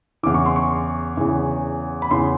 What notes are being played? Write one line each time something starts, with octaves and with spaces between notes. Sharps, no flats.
E2 C#3 E3 D6
C#6
C6
C#6
E2 C#3 E3
B5
E2 C#3 E3 C6